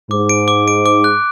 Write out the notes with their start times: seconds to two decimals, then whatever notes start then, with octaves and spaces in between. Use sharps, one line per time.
0.10 G#2 D6
0.29 D7
0.48 D6
0.68 D7
0.86 D6
1.04 F#6